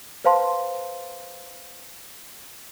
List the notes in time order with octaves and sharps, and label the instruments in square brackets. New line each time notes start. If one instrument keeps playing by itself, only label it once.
[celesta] B4 C5 F5 A5 C6